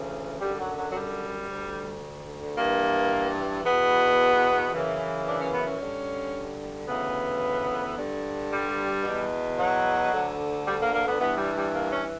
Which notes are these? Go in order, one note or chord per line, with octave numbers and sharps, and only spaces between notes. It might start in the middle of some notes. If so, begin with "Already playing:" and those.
Already playing: D2 C#3 E3
F#2 D3 G3
F#3
F#3
F#3
G3
D2 D3
G2 E3 A#3
E2 B2 B3
F#2 C#3 E3
D4
C#4
B3
C#4
G2 D3
D2 C#3 E3 B3
G2 D3
G3
E2 B2
F#3
D2 D3
G3
A#3
A#3
B3
G2 E3 B3
G3
G3
A#3
C#4